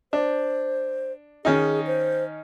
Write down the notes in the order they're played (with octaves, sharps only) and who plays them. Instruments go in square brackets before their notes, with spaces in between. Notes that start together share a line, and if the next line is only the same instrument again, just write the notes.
[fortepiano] D4 [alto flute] C5
[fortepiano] D#3 C#4 D#4 [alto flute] G#4
[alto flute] C5